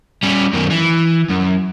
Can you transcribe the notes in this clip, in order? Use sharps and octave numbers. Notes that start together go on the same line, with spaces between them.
G3 C#4
F#2 D#3
E3
F#2